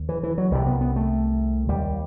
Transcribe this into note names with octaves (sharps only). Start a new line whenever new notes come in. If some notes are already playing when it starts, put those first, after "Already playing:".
Already playing: D#2
E3
E3
F#3
C2 C3 G3
B3
B3
A3
D#2 G3